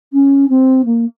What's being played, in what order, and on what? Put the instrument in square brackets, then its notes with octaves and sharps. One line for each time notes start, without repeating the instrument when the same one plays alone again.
[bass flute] C#4
C4
A#3